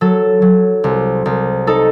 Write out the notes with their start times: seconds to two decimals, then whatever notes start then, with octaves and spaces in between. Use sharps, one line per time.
0.01 F#3 A4
0.42 F#3
0.84 C2
1.26 C2
1.67 D#4 A4